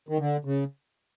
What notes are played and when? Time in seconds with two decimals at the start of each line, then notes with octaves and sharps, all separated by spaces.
0.09 D#3
0.18 D3
0.45 C#3